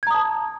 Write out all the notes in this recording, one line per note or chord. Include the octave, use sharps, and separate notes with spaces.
A5 A#5 D#6 G#6